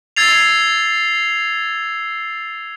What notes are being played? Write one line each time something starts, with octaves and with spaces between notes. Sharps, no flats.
E6 G#6 A6 C7 F7